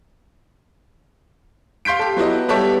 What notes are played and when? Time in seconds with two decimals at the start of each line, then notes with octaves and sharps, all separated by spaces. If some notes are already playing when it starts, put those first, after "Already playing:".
1.85 F5 C6 G6 B6 D7
1.99 G4 A4
2.17 F#3 B3 E4 D#5
2.48 G3 B3 G4 A4 C#5 E5